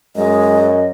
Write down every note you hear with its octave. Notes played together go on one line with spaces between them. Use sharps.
F#2 G#3 D#5